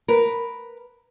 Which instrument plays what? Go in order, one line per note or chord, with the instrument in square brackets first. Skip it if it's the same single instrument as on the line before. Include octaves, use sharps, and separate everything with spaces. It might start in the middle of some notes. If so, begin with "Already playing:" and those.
[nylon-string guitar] A#4 B4